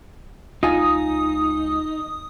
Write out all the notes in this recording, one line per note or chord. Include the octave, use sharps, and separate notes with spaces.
C#2 D#4 F4 G#5 D#6